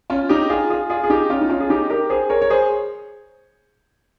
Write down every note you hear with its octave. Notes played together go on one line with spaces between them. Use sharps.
C#4 F4
D#4 G4
F4 G#4
F4 G#4
F4 G#4
G#4
D#4 G4
C#4 F4
D#4
C#4 F4
G#4
D#4 G4
G4 A#4
G#4 C5
A#4 C#5
C#5
G#4 C5